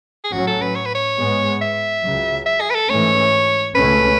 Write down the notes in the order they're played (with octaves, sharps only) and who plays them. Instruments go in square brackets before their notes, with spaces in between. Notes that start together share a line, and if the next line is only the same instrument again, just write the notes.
[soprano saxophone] G#4
[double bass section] A2 F#3 C#4 [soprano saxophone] F#4
[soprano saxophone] A4
B4
C#5
B4
C#5
[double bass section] G#2 G#3 B3
[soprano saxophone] E5
[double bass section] C#2 C#3 F#3
[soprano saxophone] E5
G#4
B4
A4
[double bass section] G#2 E3 A3 C#4 [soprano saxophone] C#5
[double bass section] C#2 B2 A3 C#4 [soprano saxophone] B4